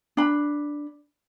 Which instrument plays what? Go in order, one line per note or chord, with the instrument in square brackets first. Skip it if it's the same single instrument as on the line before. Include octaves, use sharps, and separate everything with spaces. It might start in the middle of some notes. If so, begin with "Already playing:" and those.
[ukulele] D4 B5